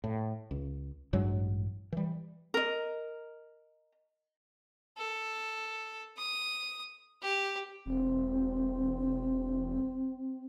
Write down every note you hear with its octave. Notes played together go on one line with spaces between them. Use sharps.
A2
C#2
A1 G2 F#3 G#3
E3 G3
A#4 D#5
A4
D#6
G4
E1 C4